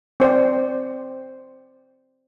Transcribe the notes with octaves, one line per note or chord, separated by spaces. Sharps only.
C4 C5 D5 G5